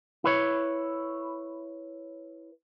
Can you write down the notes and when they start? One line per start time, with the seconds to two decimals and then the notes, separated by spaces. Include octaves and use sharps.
0.24 E4 B4 C#5